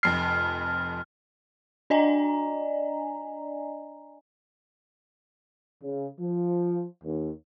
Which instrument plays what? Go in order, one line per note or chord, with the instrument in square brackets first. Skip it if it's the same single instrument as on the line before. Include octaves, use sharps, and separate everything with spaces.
[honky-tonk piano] F1 F2 C7 [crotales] F6
[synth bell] D4 D5 D#5 G#5 A#5
[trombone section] C#3
F3
D#2